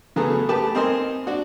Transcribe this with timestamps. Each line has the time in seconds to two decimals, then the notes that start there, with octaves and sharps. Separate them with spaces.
0.16 C#3 F#3 A3 B3 G#4 A4
0.49 A3 G4 B4 A5
0.75 C4 D#4 A#4 D#5 G#5 C6
1.27 D4 F#4